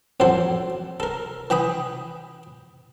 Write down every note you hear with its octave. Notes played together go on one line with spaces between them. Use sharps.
A1 F2 F#3 A4 C5
A4 A#4
E3 G5 B5 D#6